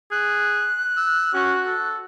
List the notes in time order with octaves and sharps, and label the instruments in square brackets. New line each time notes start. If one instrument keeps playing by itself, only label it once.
[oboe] G#4 [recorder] F#6
[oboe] E6
[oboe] C#4 [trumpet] F#4
[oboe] A4